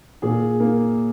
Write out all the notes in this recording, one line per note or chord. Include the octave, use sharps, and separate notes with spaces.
A#2 G#4
A#3